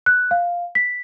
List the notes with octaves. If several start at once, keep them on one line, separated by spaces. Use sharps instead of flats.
F#6
F5
B6